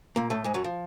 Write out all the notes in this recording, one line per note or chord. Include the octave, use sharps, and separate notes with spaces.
A#2 A#3
A2 A3
G#2 G#3
F#2 F#3
F3